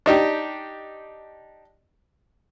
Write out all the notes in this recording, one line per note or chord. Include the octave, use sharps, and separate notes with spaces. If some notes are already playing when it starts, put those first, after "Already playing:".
D4 D#4 G4